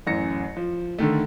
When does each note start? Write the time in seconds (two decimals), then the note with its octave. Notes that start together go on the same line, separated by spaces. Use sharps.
0.07 A1 F#2 A#6 C#7
0.57 F3
0.98 D3 D#3 A3